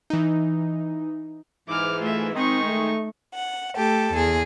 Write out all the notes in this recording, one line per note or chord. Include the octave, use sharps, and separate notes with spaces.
E3 D#4
G#2 E3 D6 F6
A3 F4 E5
D#3 G#3 C4 D#4 C#6
A3
F#5
A3 G4 A4
E2 G#4